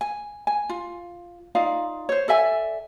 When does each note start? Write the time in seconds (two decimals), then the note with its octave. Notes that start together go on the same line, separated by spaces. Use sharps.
0.01 G#5
0.47 G#5
0.69 F4
1.55 D#4 F4 D5 F5
2.09 C5 C#5
2.28 A4 D5 E5 G#5